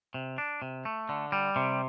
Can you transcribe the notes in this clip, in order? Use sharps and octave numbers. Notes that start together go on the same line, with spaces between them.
C3
D4
C3
A3
D3
G3
C3